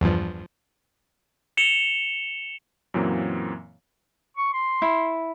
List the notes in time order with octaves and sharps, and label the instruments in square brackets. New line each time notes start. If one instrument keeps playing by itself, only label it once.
[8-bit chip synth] E2 G2 F3
[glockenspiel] C#7 E7 F7 G7
[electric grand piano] F#2 A#2 E3 F#3 A#3 C4
[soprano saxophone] C#6
C6
[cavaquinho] E4